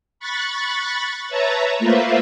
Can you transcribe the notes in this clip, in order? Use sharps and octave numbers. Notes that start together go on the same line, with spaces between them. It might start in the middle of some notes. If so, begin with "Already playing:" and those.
B5 C#6 F#6 A6
B4 C#5 E5 A5 A#5
A3 A#3 F4 B4 C5 E5